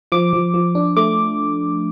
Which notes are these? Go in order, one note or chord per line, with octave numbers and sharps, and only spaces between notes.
F3 D6
F3
F3
D4
A3 D6